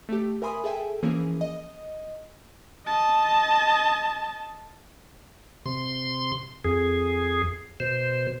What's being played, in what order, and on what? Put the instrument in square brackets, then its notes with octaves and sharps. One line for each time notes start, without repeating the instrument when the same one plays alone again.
[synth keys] A3 G4
A#4 E5 G#5 B5 C6 D#6
G#4 A4 E5 G5 G#5
E3 F3 A#3 C#4 G#4 A#4
D#5
[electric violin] D#5 A5
[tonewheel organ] C3 C6
F2 G#4
B2 C5